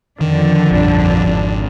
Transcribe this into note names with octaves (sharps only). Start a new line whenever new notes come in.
F2 D3 D#3 D4
A#1 G2
G#1